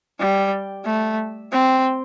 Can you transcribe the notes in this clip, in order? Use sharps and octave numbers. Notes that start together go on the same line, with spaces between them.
G3
A3
C4